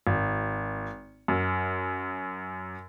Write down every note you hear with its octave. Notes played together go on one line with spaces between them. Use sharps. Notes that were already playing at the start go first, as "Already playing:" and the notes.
G#1
F#2